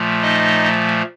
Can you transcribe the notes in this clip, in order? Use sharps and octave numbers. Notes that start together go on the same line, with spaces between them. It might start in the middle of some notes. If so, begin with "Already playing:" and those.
Already playing: A#2 F3 A3
D#4 D#5